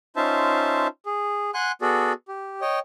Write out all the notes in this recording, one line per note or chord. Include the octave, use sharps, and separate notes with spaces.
C#4 D#4 F4 C5 E5 A5
G#4
F#5 G#5 C6 F#6
B3 F#4 G#4 A4 D5
G4
C#5 D#5 G5